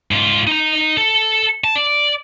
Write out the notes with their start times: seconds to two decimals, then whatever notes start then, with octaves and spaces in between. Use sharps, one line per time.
0.11 G#2 F4
0.47 D#4 A#5
0.97 A4
1.64 A5
1.76 D5